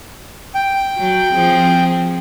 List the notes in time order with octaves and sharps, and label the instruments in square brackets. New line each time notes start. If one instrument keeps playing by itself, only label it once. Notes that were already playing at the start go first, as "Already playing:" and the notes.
[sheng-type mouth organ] G5
[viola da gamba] F#3
F3 C4 G#4